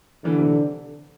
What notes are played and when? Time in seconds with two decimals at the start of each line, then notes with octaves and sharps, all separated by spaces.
0.24 D3 E3 G3
0.38 C3 E3